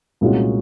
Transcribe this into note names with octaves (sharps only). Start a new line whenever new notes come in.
C2 A#2 G#3 C#4 F#4